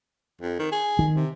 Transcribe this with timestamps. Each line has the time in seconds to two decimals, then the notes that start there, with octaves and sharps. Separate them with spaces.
0.41 F2
0.59 D#3
0.72 G#4
0.99 D#3
1.15 C3